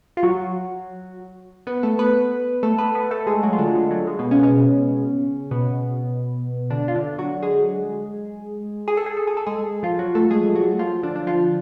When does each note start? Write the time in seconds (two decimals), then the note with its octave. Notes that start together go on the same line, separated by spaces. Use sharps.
0.17 F4
0.23 F#3 F#4
1.67 B3 B4
1.83 A3 A4
1.99 B3 B4
2.63 A3 A4
2.78 B3 B4
2.95 B3 B4
3.11 A3 A4
3.27 G#3 G#4
3.43 F#3 F#4
3.53 F4
3.58 D3 D4
3.67 F#3
3.75 G#3
3.91 F#3
4.07 G#3
4.19 B2 B3
4.31 C#3 C#4
4.39 B3
4.43 C#3 C#4
5.51 B2 B3
6.70 D3 D4
6.88 F4
6.95 D3 D4
7.18 F#3 F#4
7.43 G#3 G#4
8.88 G#4
8.97 A4
9.06 G#4
9.17 A4
9.27 G#4
9.37 A4
9.47 G#3 G#4
9.83 F3 F4
9.99 F#3 F#4
10.15 A3 A4
10.31 G#3 G#4
10.55 F#3 F#4
10.79 F3 F4
11.03 D3 D4
11.16 D4
11.27 F3 F4